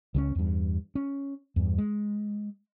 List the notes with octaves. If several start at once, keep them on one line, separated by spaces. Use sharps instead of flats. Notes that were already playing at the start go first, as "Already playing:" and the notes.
C#2 F#3 C#4
E2 G2
C#4
E2 G2
G#3